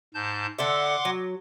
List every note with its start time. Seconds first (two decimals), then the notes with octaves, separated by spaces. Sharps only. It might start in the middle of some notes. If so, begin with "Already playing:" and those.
0.14 G#2 A5 G6
0.59 D3 A4 E5 F#5 C6 D6
1.05 F#3